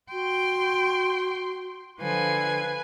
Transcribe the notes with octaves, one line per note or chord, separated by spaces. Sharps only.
F#4 G5 C6
D3 F3 B4 G#5